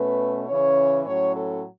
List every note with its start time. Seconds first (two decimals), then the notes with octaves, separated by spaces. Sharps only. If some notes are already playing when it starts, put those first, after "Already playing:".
Already playing: B2 A3 C#4 B4
0.46 C#3 E3 C#4 C#5
1.06 A2 F#3 C#4 C#5
1.36 A4